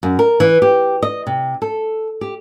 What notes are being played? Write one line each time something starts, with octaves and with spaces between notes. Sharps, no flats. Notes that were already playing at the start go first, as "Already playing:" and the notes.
F#2
A#4
E3
G4
D#5
C3
A4
G4